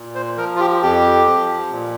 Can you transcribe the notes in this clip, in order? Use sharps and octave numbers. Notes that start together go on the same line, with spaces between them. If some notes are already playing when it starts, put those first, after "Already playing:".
Already playing: A#2
C5
F3 A#4
F4
G4
F2 G4
F3
A#2